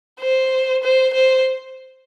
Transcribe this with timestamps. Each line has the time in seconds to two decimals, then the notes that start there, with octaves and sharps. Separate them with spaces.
0.20 C5
0.83 C5
1.13 C5